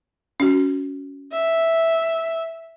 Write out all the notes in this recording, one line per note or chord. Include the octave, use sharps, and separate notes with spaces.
C#4 F#4
E5